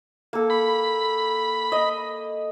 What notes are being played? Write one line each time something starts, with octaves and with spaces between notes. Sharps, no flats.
A#3 A4
B5
D#5